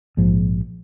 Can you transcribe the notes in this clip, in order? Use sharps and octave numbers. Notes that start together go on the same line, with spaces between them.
A#1 G#2 F3